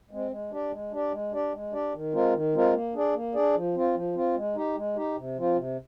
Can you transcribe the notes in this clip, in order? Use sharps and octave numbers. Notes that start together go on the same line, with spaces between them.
G#3 C4
G#3
D4 G4 D5
G#3
D4 G4 D5
G#3
D4 G4 D5
G#3
D4 G4 D5
D#3
G#3 C4 F4 A#4
D#3
G#3 C4 F4 A#4
A#3
D4 G#4 D5
A#3
D4 G#4 D5
F3
C4 F4
F3
C4 F4
G#3
D#4 G4
G#3
D#4 G4
C3
F3 C4 F4
C3